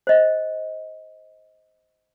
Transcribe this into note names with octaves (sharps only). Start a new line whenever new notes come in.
C5 D#5